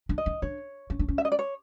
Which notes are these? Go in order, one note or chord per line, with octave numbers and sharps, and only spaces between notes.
D4
D#5
D#4
D4 C#5
C#4
D4
C#4
E5
D#5
D5
C#5